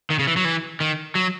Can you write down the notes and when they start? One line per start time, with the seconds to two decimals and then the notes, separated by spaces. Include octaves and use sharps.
0.10 D#3
0.19 C#3
0.27 E3
0.37 F#3
0.45 E3
0.80 D#3
1.15 F#3